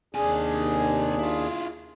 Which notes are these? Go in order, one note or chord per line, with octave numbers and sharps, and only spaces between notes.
D#2 C3 D4 G#4 G#5
E4 F4